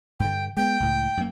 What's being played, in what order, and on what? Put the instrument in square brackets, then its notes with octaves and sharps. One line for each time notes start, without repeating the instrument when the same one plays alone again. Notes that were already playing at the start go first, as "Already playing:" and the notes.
[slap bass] G2 D3 [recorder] G5
[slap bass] G#3 B3 [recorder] G5
[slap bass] C#2 A2
F#2 A#3